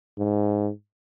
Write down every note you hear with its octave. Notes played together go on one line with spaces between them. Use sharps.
G#2